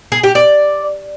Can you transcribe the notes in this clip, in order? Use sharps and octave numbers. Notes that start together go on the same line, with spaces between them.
G#4
G4
D5